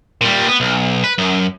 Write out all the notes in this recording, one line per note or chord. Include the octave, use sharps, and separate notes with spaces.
A#2 G3
B3
B1
B4
F#2